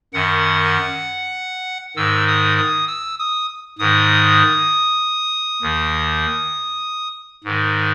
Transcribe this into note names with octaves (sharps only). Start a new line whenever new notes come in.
F#2 D#3 F#5
G#2 D#3 E6
D#6
D#6
E6
D#6
G#2 D#3 D#6
D#2 D#3
G#2 D#3